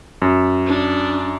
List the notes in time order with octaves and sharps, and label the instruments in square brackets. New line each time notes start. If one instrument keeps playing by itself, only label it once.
[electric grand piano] F#2
[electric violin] D4